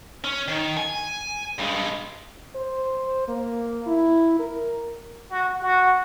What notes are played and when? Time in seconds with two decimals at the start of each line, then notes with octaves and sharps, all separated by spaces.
0.24 C#4
0.48 D#3
0.77 G#5
1.59 G2 G#3
2.55 C5
3.28 A#3
3.87 E4
4.40 A#4
5.30 F#4
5.61 F#4